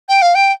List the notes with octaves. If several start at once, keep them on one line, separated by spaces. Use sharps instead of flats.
G5
F5
G5